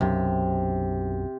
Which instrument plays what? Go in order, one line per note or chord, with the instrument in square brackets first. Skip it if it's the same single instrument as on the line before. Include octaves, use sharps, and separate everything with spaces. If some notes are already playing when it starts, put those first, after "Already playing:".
[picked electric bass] B1 F#2 [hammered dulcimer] C3